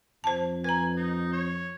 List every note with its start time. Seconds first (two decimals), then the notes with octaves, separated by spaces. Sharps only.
0.24 F2 C5 A5
0.64 B4 G#5 A#5
0.96 D#4
1.33 C#5